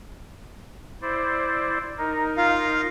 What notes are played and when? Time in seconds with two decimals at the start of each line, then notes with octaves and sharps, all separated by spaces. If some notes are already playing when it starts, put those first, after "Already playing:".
1.02 E4 C5 D5
1.98 D#4 A#4
2.37 F4 F5